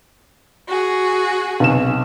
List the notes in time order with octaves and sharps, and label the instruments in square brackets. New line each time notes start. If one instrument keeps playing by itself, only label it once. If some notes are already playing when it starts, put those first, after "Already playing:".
[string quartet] F#4 G#4
[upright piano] B1 C3 E7